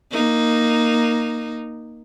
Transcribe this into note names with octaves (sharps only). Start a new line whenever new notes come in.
A#3 D#4